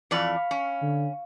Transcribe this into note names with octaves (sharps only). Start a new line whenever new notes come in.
F2 E3 D5 F5 B5 C#6
C#4
D3